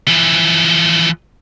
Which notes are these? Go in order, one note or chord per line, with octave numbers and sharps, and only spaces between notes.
E3 F3